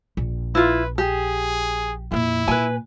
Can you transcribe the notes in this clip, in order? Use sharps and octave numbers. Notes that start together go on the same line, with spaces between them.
A#1
E4 F4 B4
G4 G#4
F2 A#2 E4
A#2 B4 G#5